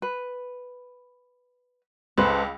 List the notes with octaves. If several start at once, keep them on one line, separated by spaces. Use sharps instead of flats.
B4
C#2 A4 B4 C5